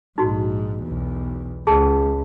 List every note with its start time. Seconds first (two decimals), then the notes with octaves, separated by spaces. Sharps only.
0.18 A#1 G#2 D#4 F#4
0.83 B1 E2
1.67 C#2 G#4 A5